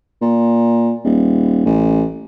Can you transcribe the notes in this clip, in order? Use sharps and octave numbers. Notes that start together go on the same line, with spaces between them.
A#2
D#1
A1